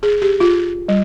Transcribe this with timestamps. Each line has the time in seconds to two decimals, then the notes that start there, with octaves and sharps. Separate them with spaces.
0.03 G#4
0.22 G4
0.40 F4
0.88 G3